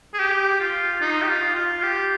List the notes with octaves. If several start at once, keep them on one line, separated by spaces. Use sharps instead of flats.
G#4
G4
F4
D#4
G4
F4
F4
G4